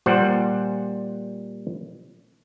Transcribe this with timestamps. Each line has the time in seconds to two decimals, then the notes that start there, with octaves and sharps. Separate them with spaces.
0.06 A#2 G3 C5 F#5